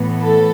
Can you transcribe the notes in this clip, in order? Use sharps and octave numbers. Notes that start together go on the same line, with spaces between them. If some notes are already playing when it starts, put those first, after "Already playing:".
Already playing: A2 E3 B3
A4